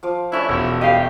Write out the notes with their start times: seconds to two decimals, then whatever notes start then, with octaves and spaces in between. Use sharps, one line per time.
0.03 F3 F5 D6
0.32 A3 C#4 D4 E4
0.49 E1 E4
0.81 G3 A3 D#4 G4 D#5 F5